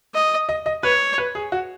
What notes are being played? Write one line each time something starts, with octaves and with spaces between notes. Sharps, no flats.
D#5
D#5
D#5
B4 C#5
B4
G#4
F#4